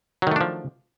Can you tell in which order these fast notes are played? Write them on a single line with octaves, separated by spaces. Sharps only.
F#3 D#3 A3 D4 F3